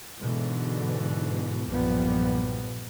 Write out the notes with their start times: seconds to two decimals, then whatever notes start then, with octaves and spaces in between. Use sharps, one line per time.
0.19 G#2 B2 D3 E3
1.66 B1 G2 A#2 F3 G3 B3